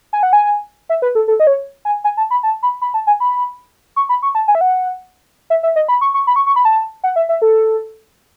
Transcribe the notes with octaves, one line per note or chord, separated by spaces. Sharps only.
G#5
F#5
G#5
E5
B4
A4
A4
D#5
C#5
G#5
G#5
A5
B5
A5
B5
B5
A5
G#5
B5
C#6
B5
C#6
A5
G#5
E5
F#5
E5
E5
D#5
B5
C#6
C#6
B5
C#6
C#6
B5
A5
F#5
E5
E5
A4